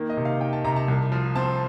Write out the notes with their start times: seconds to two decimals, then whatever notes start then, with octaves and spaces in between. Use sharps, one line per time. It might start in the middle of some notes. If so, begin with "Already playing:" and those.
Already playing: D#3 A#3
0.10 D#5
0.17 C3
0.25 F5
0.40 D#3 G5
0.53 A5
0.64 C3 A#5
0.76 A5
0.88 C2
1.12 F3
1.35 C4 A5